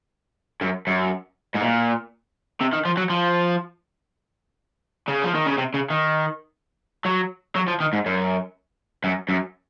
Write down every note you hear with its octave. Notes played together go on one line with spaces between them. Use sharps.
F#2
F#2
G#2
A#2
C3
D#3
F3
F#3
F3
C#3
F3
D#3
C#3
C3
C#3
D#3
F#3
F#3
F3
D#3
G#2
F#2
F#2
F#2